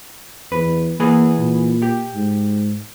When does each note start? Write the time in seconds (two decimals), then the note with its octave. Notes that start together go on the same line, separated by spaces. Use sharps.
0.52 E2 B4
1.00 E3 A#3 G#4 B4
1.38 A#2
1.82 G4
2.14 G#2